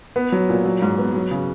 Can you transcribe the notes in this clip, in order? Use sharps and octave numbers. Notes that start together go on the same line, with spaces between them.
B3
F#3
A#2
F#3
G#2
B3
F#3
C#3